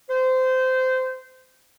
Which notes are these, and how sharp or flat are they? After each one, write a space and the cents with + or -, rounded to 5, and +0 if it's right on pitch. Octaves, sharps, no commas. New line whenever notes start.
C5 -20